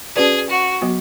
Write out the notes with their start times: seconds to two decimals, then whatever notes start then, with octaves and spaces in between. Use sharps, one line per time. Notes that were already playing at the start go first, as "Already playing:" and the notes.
0.15 C#4 F#4 G#4 B4 D5
0.50 F#4
0.82 F#3 B3 F#4